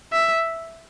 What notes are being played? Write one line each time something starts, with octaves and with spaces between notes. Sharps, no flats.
E5